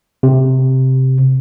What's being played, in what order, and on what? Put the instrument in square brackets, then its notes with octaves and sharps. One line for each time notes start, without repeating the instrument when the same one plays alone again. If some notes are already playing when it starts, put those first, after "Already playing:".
[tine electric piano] C3